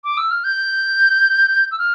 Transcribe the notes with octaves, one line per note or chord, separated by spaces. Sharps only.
D6
E6
F6
G6
E6
F6